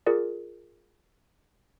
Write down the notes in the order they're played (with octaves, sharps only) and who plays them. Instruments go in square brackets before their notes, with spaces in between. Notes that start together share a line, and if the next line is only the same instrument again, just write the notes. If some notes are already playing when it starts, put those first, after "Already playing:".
[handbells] F4 G#4 A#4 D5